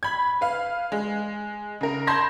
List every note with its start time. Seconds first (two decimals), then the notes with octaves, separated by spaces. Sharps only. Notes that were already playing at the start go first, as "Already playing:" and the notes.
0.03 B5 G#6
0.41 B4 F5
0.92 G#3
1.81 C#3 A#4
2.07 A5 B5 C6 G6 G#6 A#6